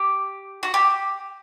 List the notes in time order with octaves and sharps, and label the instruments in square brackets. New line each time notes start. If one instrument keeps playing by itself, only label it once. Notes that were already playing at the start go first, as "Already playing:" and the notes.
Already playing: [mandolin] G4
F#4
G4